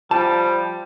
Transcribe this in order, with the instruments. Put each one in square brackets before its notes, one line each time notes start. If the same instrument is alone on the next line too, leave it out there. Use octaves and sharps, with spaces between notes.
[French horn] F3 [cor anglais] G3 [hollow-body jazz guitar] A5